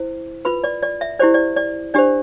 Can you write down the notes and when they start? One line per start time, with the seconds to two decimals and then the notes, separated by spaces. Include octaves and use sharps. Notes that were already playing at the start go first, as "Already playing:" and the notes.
Already playing: E4 C5
0.45 F4 B4 B5
0.64 D5
0.82 D5
1.01 E5
1.19 E4 G4 C5 D5
1.34 D5
1.56 D5
1.94 D4 G4 C5 D5